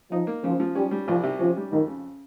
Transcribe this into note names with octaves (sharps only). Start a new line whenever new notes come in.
F3 D#4
A#3
C#3 F3
F3
G3 C#4
G3
C2 F3
C3
F3 C#4
G3
F2 D#3
C#3